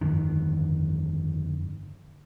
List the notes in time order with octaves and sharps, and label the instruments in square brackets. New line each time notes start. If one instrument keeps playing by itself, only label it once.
[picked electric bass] G1 F2 D3 D#3